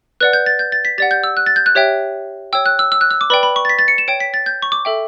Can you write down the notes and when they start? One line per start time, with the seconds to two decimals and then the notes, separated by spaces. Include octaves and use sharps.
0.20 B4 D5 F#5 F#6
0.33 G6
0.46 A6
0.59 G6
0.72 A6
0.85 B6
0.98 G4 D5 F#5 A6
1.11 G6
1.24 E6
1.37 F#6
1.46 A6
1.56 G6
1.66 F#6
1.75 G4 C#5 E5 G5
2.53 C#5 G5 E6
2.66 F#6
2.79 E6
2.92 E6
3.01 F#6
3.11 E6
3.21 D6
3.30 B4 D5 G5 B5
3.43 B5
3.56 C#6
3.65 A6
3.69 B6
3.79 A6
3.88 C#7
3.98 E7
4.08 C#5 G5 D7
4.20 B6
4.34 A6
4.46 G6
4.62 C#6
4.72 D6
4.85 A4 E5 G5